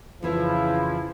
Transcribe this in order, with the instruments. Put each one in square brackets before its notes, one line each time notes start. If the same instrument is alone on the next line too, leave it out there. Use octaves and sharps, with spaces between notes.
[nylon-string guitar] F2 E3 F4 [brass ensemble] C#3 F3 [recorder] E4